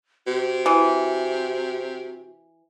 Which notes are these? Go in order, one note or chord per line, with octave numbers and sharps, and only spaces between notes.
C3 F#4
E3